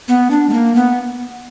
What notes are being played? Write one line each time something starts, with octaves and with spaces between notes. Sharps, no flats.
B3
D4
G#3
A#3
B3